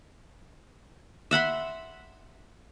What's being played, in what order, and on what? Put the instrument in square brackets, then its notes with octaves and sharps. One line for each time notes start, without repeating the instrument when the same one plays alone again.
[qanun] E5 F#5 B5 C6